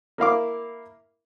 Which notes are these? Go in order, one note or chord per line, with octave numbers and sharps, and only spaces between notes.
A#3 E4 F5 D6